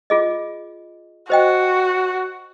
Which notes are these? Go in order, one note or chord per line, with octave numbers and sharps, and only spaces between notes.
F4 G#4 D#5
F#4 C5 D#5 G5